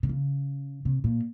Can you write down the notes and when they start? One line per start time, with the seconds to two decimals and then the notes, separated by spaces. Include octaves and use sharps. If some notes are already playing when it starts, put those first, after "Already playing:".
0.03 C3
0.09 C#3
0.85 C3
1.04 A#2